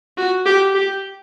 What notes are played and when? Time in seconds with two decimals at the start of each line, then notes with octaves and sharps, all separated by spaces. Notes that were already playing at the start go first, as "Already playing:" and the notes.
0.17 F#4
0.46 G4
0.74 G4